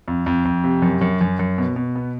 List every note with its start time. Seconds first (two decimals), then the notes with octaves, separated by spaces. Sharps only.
0.08 F2
0.26 F2
0.45 F2
0.64 C3
0.82 F#2
1.01 F#2
1.21 F#2
1.39 F#2
1.58 B2
1.76 B2
1.96 B3